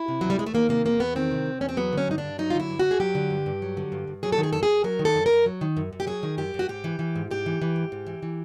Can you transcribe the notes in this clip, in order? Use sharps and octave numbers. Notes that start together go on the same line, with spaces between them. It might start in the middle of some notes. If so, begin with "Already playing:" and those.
Already playing: E4
C3
E2 F#3
G3
E2 G#3
A3
D#3 A#3
C3 A#3
E2 A#3
E2 B3
D#3 C4
C3
E2
E2 C#4
C4
F#3 B3
D3 C#4
G2 D#4
D4
G2
F#3 D#4
F4
D3
E4
G2
F#4
G2
G#4
F#3 G4
D3
G2
G2
F#3
D3
G2
G2
F#3 G#4
A4
D#3
G#4
F#2 A4
G#4
F#2
F#3 A#4
D#3
A4
F#2
F#2 A#4
F#3
D#3
F#2
F#2
G4
F#3 G#4
D#3
F#2 G4
F#2
F#4
G#2 G4
E3
E3
G#2
G#2 G4
E3
E3
G#2
G#2
E3
E3